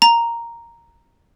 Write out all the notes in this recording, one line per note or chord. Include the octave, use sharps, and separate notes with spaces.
A#5